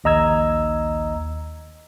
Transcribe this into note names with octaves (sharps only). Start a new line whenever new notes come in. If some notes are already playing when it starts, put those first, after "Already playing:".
A#1 D#2 D#5 A#5 E6 G#6